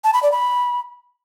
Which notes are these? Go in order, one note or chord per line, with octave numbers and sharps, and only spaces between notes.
A5
B5
D5
B5